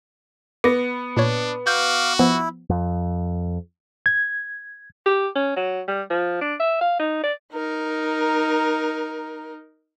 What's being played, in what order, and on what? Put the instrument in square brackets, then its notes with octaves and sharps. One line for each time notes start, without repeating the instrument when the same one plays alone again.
[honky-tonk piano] B3 [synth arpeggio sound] D6 A#6
[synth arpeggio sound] A#2 C#5 [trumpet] D4
[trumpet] F#4 [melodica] F5 D6 [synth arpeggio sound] G6
[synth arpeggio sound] F3 B3 [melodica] E4
[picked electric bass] F2
[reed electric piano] G#6
[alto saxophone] G4
C#4
F#3
G3
F3
D4
E5
F5
D#4
D5
[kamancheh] D#4 A#4